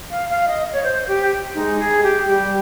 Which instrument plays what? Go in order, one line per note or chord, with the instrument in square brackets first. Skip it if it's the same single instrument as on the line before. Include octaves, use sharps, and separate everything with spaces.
[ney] F5
F5
D#5
C#5
C5
G4
[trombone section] G#3 [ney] D#4
[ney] G#4
G4
[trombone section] G3 [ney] G4